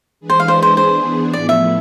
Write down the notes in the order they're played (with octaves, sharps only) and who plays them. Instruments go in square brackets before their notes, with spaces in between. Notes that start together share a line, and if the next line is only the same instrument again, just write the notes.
[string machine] E3 G#3 D4 G#4 B4
[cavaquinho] C5
F5
C5
C5
[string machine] E3 B3 D4 G#4 [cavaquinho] C5
[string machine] A2 F3 B3 E4 [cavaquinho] D5
[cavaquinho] E5